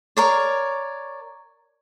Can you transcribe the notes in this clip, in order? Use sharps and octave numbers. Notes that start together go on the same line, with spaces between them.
A#4 C#5 D5